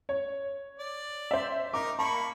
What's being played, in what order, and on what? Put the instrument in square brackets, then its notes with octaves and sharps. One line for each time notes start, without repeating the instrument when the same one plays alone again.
[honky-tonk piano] C#5
[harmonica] D5
[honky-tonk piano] C5 E5
[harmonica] D#4 A#4 [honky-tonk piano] D6
[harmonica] A#3 B5 C#6 [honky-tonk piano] A5